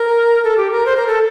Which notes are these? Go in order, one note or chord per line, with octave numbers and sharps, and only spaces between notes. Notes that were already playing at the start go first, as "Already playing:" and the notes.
Already playing: A#4
A4
G4
A#4
C5
A#4
A4